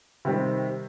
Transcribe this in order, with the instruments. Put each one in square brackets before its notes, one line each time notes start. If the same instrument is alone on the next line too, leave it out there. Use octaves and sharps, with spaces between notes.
[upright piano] C3 D#3 G3 C4